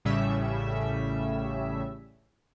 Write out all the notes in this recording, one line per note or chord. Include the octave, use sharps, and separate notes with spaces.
A1 A2 C#3 G3 C#4 E5